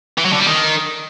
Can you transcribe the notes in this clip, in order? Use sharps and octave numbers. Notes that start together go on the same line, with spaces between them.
E3
F#3
D3
G3
D#3